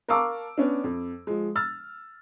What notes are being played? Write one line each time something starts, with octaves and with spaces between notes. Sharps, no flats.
A#4 F5 A5 C#6 D6 E6
B3 C#4 D4
F2
F3 G#3
E6 F6 A6